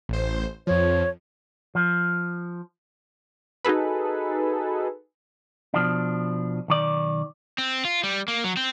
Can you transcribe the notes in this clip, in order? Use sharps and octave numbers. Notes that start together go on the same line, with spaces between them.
A1 C5
F2 F3 C#5
F3
D#4 F#4 G#4 A4 B4
B2 F3 D4
B1 D#3 D5
C4
F4
G3
A#3
F#3
C4